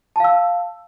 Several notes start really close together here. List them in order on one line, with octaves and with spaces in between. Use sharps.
A5 F5 E6